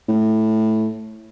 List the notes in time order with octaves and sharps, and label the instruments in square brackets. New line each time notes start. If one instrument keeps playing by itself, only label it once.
[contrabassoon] A2